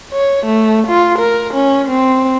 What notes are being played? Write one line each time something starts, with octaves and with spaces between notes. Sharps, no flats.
C#5
A3
F4
A#4
C#4
C4